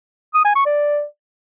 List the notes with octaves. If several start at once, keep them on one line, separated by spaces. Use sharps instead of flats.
D#6
G#5
C#6
D5